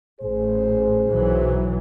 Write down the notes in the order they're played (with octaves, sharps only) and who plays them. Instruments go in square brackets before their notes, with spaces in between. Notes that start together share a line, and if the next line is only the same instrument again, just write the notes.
[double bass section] A1 [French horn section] G#4 C5
[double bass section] B1 E3 F#3